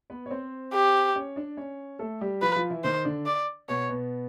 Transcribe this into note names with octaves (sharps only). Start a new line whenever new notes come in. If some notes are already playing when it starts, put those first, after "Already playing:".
B3 B4
C#5
C4 C5
G4
C#4 C#5
D4 D5
C#4 C#5
A3 A4
G3 G4
F3 F4 B4
F3 F4
E3 E4
D#3 D#4 C5
D3 D4
D5
B2 B3 C#5
B2 B3